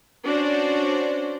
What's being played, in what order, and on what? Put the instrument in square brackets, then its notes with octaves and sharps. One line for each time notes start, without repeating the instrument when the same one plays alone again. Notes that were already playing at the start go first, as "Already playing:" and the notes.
[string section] C#4 D4 F#4 C5 D5